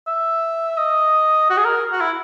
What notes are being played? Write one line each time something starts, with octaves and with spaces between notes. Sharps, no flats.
E5
D#5
F#4
G#4
A#4
F#4
E4